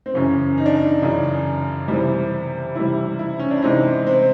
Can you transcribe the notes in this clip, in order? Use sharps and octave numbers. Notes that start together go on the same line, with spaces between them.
C4
F#2 C#3 E3 C#4
D#4
D4
D#4
F#2 C#3 E3
C3 E3 G3
C3 E3 G3 E4
E4
C#4
D4
C3 E3 G#3 D#4
C4